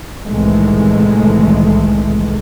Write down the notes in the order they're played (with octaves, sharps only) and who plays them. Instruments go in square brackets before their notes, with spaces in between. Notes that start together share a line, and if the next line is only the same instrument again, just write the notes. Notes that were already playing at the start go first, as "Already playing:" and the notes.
[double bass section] C2 A2 D#3 E3 G#3 A3